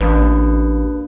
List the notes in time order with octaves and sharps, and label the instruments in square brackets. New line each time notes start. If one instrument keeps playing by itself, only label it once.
[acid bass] A1 [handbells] A#3 D4 B4